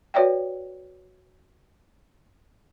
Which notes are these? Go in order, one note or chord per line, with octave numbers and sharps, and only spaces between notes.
F#4 B4 C#5 D5 E5 G5